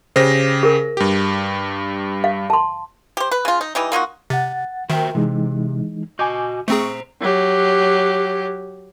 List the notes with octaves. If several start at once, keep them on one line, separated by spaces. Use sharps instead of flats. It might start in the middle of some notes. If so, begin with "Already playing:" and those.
C#3 G4 C5 A#6
G#4 A#4
G2 G4
F5
A5 C6
G4 C5
B4
C#3 F4
D#4
E3 G3 D#4
A#3 D#4 F4 F#4
C3 F#5 A6
D#3 F#4 A#4 C5 E5 G5
C3 E3 G#3 D#4
F#4 D#5 G#5 D6 G6
A3 C4 G#4 C5 A#5 C#6
F#3 G4